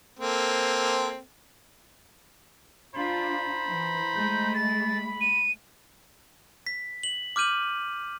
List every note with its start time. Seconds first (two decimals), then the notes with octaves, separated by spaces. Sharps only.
0.20 A#3 C4 A4
2.95 D4 F4 C5 A#5 B5
3.67 E3
4.16 G#3 A3 G6
4.54 B5 A6
5.21 D#7
6.67 B6
7.03 F#7
7.36 D6 F6 G6 D#7 F#7